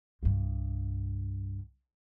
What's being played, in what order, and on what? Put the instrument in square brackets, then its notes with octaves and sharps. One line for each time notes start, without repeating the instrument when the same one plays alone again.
[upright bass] C2 G2